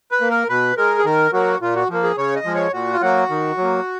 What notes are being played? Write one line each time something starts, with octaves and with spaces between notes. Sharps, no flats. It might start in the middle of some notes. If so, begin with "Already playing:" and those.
B4
A#3
A#4
B2 B4
G#3 A#4
G#4
D#3 A#4
F#3 A#3 F#4
A#2 F4
F#4
F3 A#3
G#4
C#3 C#5
D#5
F3 G#3
C#5
A#2 F#4
F4
F#3 A#3 F#4
D#3
F#3 A#3